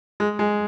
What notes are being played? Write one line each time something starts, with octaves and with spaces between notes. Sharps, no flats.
G#3
G#3